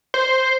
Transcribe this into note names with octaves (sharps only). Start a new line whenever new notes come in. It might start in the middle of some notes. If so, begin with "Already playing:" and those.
C5